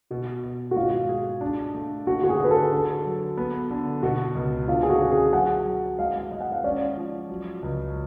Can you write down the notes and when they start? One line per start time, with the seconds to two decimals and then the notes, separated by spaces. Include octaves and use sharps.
0.10 B2 F#4
0.43 B2
0.71 F#4
0.76 G#2 F4
1.09 G#4
1.41 D4
1.75 A3
2.07 D3 F#4
2.24 F#4
2.29 G#4
2.40 D3 B4
2.51 A4
2.72 D3
3.05 F#3
3.37 B3
3.71 D3
4.03 B2 F#4
4.35 C#2
4.68 D3 F4
4.83 G#4
4.90 F#4
5.01 C#4
5.11 G#4
5.33 F#3 F#5
5.66 F#3
5.99 G#3 F5
6.32 G#3
6.41 F#5
6.52 F5
6.64 C#4 D5
6.97 F3
7.29 F#3
7.62 C#2